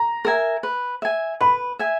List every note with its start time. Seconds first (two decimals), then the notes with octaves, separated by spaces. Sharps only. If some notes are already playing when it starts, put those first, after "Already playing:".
Already playing: A#5
0.25 A#4 E5 G#5
0.63 B4
1.02 E5 G#5
1.41 B4 B5
1.79 E5 G#5